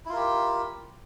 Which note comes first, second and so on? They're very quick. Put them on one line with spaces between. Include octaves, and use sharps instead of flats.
E4 F4 A#4 G4